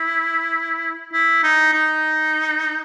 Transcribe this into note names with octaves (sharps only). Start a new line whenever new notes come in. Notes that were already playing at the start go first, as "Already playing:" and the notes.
Already playing: E4
E4
D#4
D#4